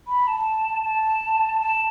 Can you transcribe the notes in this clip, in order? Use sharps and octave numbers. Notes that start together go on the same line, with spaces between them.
B5
A5
A5
A5